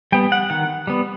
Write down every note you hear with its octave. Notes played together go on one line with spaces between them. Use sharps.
G3 B3 G5
F#5
D#3 F#5
G3 B3